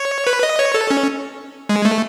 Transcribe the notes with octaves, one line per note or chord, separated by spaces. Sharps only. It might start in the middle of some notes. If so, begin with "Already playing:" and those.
Already playing: C#5
B4
D#5
C#5
A4
C#4
G#3
A3